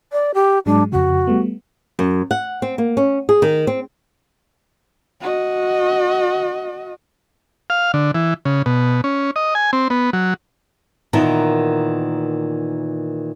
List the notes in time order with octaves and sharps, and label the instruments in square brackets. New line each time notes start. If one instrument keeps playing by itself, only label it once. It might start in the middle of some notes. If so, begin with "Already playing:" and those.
[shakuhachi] D5
G4
[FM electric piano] G#2 F#3 G#3 [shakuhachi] D4
[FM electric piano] F2 C#3 [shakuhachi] F#4
[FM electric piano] G3 A3 B3
[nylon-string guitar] F#2
F#5
C4
A#3
C#4
G#4
D#3
C4
[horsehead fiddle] F#4 D#5
[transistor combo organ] F5
D3
E3
C#3
B2
C#4
D#5
G#5
C4
B3
F#3
[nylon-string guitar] A#2 D#3 E3 B3